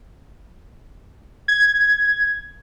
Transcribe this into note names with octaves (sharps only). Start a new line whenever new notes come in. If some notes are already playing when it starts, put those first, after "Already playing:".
G#6